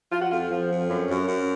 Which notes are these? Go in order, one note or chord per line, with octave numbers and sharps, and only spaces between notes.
F3 F4
F#4
F2 F4
F3
F2
F#2 C#4
F#2
F#2